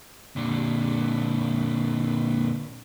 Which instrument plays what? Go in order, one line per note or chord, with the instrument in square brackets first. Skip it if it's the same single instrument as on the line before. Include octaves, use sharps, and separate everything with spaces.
[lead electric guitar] A#2 D3